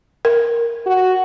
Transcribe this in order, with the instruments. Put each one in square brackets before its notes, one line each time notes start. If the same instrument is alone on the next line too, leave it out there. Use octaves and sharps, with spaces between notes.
[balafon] A#4
[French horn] F#4